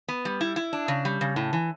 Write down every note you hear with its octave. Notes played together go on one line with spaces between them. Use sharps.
B3
G3
E4
E4
D4
C#3
G3
C#3
A2
E3